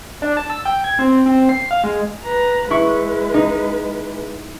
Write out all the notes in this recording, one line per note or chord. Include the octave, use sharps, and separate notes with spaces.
D4
A5
E6
G5
G#6
C4
C4
C7
F5
G#3
B4 A#5
G#3 E4 B4 C#6
D#4